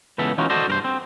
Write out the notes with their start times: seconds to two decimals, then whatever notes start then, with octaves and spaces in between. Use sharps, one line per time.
0.18 C#2 E3 B3 A4 B5
0.38 E3 C#4 D#4 F4 F#4
0.50 F#4 A4 C5 D5 D#5
0.68 G2 A#4 C5
0.85 C4